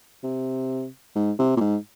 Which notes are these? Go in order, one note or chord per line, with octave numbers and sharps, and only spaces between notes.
C3
G#2
C3
A#2
G#2